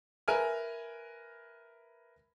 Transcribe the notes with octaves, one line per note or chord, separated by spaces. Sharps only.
A#4 B4 E5 G#5 F6